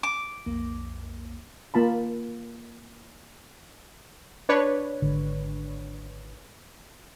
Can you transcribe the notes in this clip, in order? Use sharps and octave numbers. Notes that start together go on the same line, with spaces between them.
D6
B1 F2 A#3
A#3 F4 A5 B5
D4 B4 C#5
G#1 D3